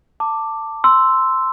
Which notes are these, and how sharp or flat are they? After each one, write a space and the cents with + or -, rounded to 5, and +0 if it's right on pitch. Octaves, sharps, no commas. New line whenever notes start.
A5 +20 D6 +0
C6 -5 E6 +0